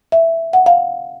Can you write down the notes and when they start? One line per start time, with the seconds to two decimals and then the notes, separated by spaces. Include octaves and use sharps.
0.12 E5
0.53 F#5
0.66 F5